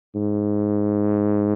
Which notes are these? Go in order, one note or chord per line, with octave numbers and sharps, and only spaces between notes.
G#2